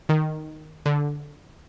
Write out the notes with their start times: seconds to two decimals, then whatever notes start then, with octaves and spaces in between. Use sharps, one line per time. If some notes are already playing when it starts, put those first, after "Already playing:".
0.09 D#3
0.86 D3